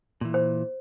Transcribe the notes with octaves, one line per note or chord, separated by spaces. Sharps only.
A#2 E3
C5